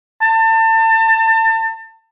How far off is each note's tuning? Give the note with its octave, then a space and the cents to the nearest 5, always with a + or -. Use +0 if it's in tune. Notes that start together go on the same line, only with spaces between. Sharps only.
A5 +30